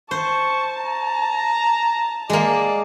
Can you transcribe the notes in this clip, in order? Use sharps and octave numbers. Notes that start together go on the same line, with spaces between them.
C5 A5 C#6
A#5
G#3 A#3 D5